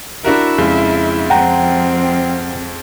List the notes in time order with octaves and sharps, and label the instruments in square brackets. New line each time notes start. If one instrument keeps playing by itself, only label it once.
[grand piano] D4 F#4 A#4 [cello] E4 E5
[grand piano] F2 C#3 G#3
[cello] F3 C4 [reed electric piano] F#5 G5 A#5